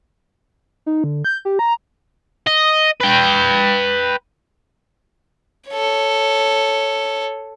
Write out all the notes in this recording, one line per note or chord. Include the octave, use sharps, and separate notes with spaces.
D#4
D3
G6
G4
A#5
D#5
B4 G5
A4 C#5